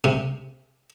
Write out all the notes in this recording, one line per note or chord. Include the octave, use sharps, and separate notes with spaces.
C3